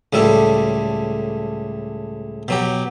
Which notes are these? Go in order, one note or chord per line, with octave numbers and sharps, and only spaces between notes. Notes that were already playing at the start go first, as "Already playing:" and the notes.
C#2 A2 G3 A4
B2 F#3 G4